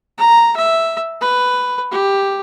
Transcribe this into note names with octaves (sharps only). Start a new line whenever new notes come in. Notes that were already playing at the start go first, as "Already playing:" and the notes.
A#5
E5
B4
G4